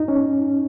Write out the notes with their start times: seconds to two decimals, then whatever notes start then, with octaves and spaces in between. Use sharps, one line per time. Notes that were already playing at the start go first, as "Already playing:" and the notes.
Already playing: D#4
0.08 C#4